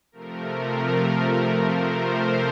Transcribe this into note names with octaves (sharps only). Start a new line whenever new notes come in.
C3 F3 A3 A#4
C5